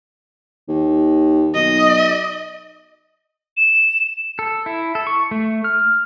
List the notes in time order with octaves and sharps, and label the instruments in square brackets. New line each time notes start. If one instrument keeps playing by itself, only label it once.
[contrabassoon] D#2
[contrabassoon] B1 [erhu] D#5
[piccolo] E7
[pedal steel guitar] A4
E4
A4
C#6
A3
F6